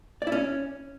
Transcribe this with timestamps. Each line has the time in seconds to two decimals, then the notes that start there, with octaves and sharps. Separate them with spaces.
0.22 D5
0.27 E4
0.32 C#4